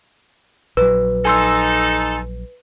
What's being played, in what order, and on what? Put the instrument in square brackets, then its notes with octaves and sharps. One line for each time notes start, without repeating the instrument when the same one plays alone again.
[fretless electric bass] A#1 F#3 [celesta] B4
[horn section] D#4 A4 [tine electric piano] G#5 C6 E6